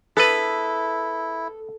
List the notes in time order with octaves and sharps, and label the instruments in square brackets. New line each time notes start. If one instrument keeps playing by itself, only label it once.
[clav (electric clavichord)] B3 B4 [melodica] E4 [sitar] A4